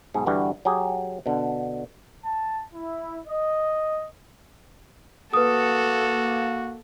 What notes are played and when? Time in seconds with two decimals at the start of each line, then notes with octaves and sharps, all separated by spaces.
0.14 B1 G#2 G#4
0.26 G2 D3 E3 G3 F#4
0.65 F#3 G4 G#4
1.26 B2 D3
2.24 A5
2.73 E4
3.24 D#5
5.33 A#3 F#4 A4 B4 D#6